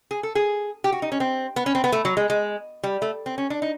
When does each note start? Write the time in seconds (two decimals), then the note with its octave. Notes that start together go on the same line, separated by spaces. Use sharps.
0.11 G#4
0.23 A4
0.35 G#4
0.84 G4
0.92 F#4
1.02 D#4
1.12 C#4
1.20 C4
1.56 B3
1.66 C#4
1.75 C4
1.84 B3
1.92 A3
2.05 F#3
2.17 G#3
2.30 G#3
2.83 G3
3.02 A3
3.26 C4
3.38 C#4
3.50 D4
3.62 D#4